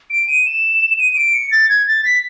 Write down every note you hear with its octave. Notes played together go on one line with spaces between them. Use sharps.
D7
D#7
E7
D#7
D#7
D7
C#7
A6
G#6
A6
B6